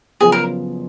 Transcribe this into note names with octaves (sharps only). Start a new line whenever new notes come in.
F#1 F#2 F3 B3 F4 G#4
A#4